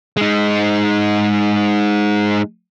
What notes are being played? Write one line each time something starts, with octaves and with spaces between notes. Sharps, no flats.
G#3 D#4